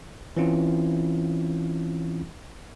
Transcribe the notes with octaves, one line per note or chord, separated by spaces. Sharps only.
E3 C4 C#4 E4 F4